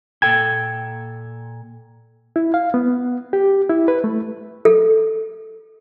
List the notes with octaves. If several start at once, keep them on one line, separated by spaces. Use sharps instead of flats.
A#2 A4 G5 G#6
E4
F5
B3
G4
E4
B4
A3
A4